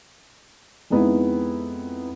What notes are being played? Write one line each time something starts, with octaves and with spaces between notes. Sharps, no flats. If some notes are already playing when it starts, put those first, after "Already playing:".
F2 G#3 B3 D#4 E4